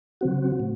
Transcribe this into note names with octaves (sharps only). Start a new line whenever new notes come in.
C#3 F#3 C4 F#4
A2